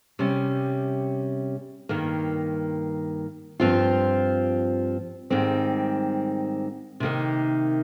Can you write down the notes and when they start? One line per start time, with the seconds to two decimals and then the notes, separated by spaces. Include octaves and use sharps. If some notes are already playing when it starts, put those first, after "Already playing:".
0.19 C3 G3 C#4
1.89 G2 D#3 A#3
3.60 G2 F3 C4 F4
5.30 G#2 D#3 G3 C4
7.00 C3 D#3 A#3 D#4